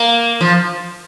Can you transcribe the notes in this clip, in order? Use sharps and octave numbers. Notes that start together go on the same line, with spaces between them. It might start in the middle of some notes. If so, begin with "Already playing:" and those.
Already playing: A#3
F3